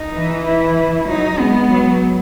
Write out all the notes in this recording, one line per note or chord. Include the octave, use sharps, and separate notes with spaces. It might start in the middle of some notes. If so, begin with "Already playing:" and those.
Already playing: D#4
E3
E4
F#3 D#4
G#3 B3
F#3